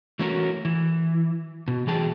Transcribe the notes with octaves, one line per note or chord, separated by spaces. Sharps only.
E3 A3 C#4 F#4 A4 A#4
E3
B2
E3 F#3 A3 G#4 G5 A5